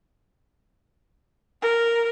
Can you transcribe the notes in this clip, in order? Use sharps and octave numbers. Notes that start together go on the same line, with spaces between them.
A#4